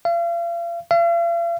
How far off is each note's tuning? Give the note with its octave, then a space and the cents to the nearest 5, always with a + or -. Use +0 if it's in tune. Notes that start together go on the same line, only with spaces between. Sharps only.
F5 -40
F5 -45